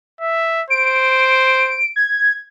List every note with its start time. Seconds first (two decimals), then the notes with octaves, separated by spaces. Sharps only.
0.21 E5
0.70 C5 D7
1.96 G#6